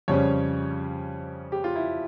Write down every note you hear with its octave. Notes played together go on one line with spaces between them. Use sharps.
F2 C#3 G3 C#4 C#5
G4
F4
E4